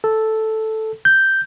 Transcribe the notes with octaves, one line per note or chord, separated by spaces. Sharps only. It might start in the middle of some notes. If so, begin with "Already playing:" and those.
A4
G6